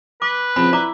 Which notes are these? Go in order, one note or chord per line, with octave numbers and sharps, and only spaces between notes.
B4 D6
C#3 F3 C4 B5
E4 D5 A#5 D6